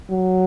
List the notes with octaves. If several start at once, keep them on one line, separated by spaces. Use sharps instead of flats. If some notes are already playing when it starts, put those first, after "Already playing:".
F#3